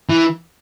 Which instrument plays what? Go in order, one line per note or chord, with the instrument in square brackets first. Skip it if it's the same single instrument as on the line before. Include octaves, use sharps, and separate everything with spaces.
[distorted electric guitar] E3